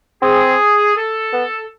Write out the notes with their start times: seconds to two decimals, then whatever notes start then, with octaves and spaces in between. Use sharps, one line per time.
0.22 C4 G#4
0.97 A4
1.33 B3